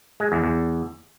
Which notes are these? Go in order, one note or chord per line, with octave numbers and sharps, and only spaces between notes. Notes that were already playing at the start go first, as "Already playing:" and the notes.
G#3
E2
E2